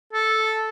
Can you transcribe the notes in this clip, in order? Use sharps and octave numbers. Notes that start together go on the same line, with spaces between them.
A4